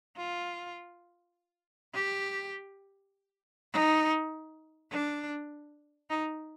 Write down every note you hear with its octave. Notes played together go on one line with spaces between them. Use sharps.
F4
G4
D#4
D4
D#4